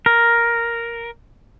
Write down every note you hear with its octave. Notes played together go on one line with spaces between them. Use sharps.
A#4